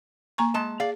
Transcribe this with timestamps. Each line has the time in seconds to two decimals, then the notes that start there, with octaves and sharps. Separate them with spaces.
0.38 A#3 A#5 C#6
0.54 G#3 A5
0.80 G#4 D5 F5